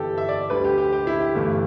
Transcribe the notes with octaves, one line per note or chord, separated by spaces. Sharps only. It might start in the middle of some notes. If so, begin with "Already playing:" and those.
Already playing: G1 G2 E3 G4 A4
E5
D5
D2 D3 G3 B4
G4
G4
G4
E4
G4
G1 G2 E3 A3